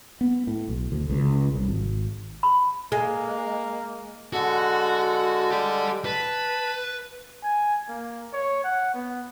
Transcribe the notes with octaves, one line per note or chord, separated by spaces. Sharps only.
B3
A2
B1
D2
C#2
C2
G#1
B5
G#3 A#3
D3 G#3 F#4 A4
G4 D5
B4 A5
G#5
A#3
C#5
F#5
B3